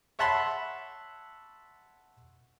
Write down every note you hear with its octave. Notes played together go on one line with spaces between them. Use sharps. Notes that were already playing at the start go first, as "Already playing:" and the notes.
C#5 E5 F#5 A5 B5 C6